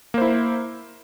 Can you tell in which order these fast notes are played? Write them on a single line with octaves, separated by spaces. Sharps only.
A#3 C5 E4